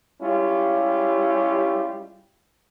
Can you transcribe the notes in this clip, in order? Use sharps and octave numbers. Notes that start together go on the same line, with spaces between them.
G3 G#3 C#4 E4 F4 G4